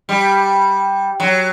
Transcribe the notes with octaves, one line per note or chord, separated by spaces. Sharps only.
G3
F#3